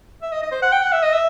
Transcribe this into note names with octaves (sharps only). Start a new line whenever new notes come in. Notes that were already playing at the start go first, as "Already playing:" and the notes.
E5
D#5
D#5
C5
F#5
G5
F#5
E5
D#5
E5